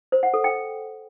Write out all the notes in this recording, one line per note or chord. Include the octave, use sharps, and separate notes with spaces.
C5
F#5
A4
G5